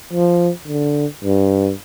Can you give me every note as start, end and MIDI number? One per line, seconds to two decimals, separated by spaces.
0.13 0.51 53
0.67 1.06 50
1.24 1.72 43